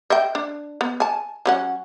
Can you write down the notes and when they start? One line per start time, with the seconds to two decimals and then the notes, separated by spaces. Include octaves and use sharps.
0.10 D#5 E5 G5
0.35 D4
0.81 B3
1.00 G#5 A5
1.46 F#3 C#4 F#5